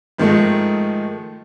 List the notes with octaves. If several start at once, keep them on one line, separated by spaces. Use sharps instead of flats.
G#2 D#3 F3 G#3 A3